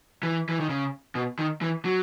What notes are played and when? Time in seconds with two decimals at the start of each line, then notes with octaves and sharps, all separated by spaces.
0.23 E3
0.49 E3
0.60 D#3
0.69 C#3
1.15 B2
1.39 D#3
1.62 E3
1.85 F#3